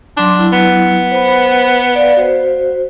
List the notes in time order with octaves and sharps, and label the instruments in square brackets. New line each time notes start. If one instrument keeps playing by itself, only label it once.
[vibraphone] F#3 C6 D6 [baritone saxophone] D4
[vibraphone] F#3 E4
[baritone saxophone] B3
[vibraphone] C5 B5
D5 F5
F#4 C5